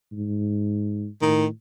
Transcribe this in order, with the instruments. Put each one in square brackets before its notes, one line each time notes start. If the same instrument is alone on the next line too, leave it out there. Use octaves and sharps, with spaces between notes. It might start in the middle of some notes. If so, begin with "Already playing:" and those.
[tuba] G#2
[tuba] A2 [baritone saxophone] D#3